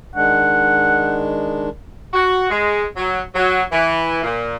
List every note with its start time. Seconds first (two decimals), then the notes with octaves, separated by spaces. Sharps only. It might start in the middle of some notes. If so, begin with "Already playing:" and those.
0.16 D#3 G#3 D4 F#5
2.14 F#4
2.50 G#3
2.97 F#3
3.35 F#3
3.72 E3
4.23 A#2